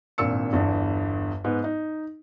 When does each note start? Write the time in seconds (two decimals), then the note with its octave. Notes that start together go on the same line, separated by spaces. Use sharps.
0.18 G#1 G2 A#2 E6 C#7
0.53 G1 E2 G2
1.44 G#2 B3
1.64 D#4